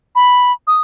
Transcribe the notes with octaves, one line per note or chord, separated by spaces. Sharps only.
B5
D#6